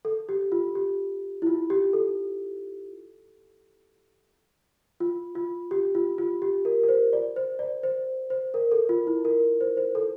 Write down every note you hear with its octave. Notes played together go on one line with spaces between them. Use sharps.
A4
G4
F4
G4
E4
F4
G4
A4
F4
F4
G4
F4
F4
G4
A#4
A#4
C5
D5
C5
D5
C5
C5
A#4
A4
F4
E4
A#4
C5
C5
A4